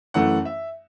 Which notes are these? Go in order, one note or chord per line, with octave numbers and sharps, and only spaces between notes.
F#2 E3 A3 F#5
E5